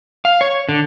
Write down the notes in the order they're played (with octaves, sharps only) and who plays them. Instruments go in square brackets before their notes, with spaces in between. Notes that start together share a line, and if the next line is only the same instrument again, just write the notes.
[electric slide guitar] F5
C#5
D3